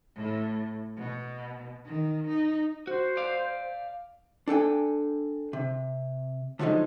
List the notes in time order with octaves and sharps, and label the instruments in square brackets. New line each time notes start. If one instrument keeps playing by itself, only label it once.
[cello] A2
B2
D#3
D#4
[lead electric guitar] F#4 [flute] C5
[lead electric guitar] D5 F5
[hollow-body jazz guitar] D4 A4 G5 G#5
C3
D3 F3 F#3 G#3 D#4